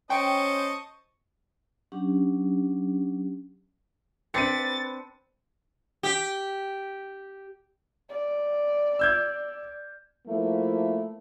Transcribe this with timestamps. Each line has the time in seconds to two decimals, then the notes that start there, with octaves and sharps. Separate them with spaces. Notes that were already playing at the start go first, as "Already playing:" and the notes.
0.10 C#4 C5 D#5 G5 A5 C#6
1.92 F#3 C#4 D4 G4
4.34 C4 D4 B4 A6 C#7 D#7
6.03 G4
8.09 D5
8.99 E6 G6 G#6
10.27 F3 A3 A#3 E4